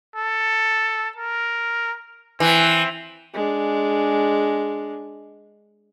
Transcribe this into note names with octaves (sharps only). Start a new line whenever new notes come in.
A4
A#4
E3 C4
G#3 D4